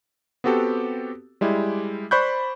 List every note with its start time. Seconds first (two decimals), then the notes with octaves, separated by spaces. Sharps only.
0.44 B3 C4 F#4 G4 A4
1.41 G3 G#3 E4 G4
2.11 C5 D5 B5 C#6 F#6 G6